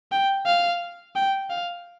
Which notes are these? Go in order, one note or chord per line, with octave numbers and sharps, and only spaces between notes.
G5
F5
G5
F5